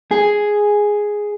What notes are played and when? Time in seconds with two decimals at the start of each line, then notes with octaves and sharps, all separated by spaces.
0.11 G#4